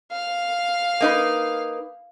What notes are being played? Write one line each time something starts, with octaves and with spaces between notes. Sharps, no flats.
F5
A#3 D#4 B4